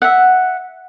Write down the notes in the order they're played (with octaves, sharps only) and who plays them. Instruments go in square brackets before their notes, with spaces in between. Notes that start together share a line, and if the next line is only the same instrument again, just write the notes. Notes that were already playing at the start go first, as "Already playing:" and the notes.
[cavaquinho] E5 F#5